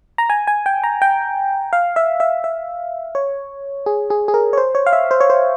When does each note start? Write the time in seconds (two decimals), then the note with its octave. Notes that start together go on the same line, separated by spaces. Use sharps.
0.18 A#5
0.30 G#5
0.47 G#5
0.66 G5
0.84 A#5
1.02 G5
1.73 F5
1.96 E5
2.20 E5
2.44 E5
3.15 C#5
3.86 G#4
4.10 G#4
4.28 G#4
4.34 A#4
4.53 C#5
4.58 C5
4.75 C#5
4.87 F5
4.93 E5
5.11 C5
5.21 C#5
5.30 C5